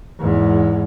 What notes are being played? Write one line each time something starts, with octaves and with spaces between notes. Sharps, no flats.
E2 G#2